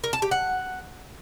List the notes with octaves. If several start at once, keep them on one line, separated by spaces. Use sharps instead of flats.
A#4
A5
G4
F#5